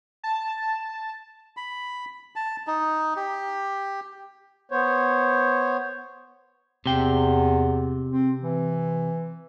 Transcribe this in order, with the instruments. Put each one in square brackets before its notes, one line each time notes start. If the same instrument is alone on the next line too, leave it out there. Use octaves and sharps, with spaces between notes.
[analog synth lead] A5
[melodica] B5
A5
D#4
G4
[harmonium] B3 C5 C#5
[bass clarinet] E2 [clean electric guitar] C3 G5
[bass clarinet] C4
E3